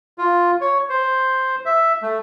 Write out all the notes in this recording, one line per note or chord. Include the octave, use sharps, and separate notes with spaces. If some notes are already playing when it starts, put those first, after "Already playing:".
F4
C#5
C5
E5
A3